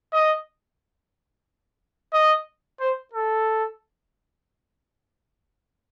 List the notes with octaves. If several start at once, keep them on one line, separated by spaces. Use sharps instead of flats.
D#5
D#5
C5
A4